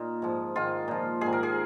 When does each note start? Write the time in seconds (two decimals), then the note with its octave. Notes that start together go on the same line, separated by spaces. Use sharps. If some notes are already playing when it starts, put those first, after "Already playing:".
Already playing: A#2 D#4 F4
0.22 G#2 F3
0.56 G#2 D#3 F4
0.88 A#2 F3
1.21 G#2 D#3 G#4
1.33 A#4
1.43 G#4